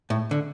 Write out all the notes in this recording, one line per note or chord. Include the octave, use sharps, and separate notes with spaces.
A2
D3